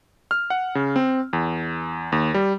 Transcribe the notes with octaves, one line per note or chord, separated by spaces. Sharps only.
F6
F#5
C#3
C4
E2
D#2
G3